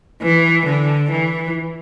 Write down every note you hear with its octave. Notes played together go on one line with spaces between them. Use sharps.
E3
D3
E3